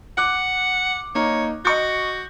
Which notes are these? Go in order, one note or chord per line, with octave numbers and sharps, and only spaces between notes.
F#5 D6 F#6
A#3 D#4 C#5
F#4 D#5 C#6 G6